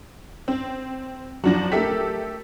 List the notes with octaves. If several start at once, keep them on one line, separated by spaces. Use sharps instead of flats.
C4
F#2 F3 D4 F#4 A#6
A3 G4 A4 A#4 E5 B6